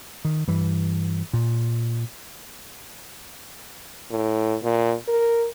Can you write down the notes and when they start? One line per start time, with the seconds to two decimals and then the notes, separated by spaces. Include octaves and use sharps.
0.25 D#3
0.48 G2 E3
1.33 A#2
4.11 A2
4.64 A#2
5.08 A#4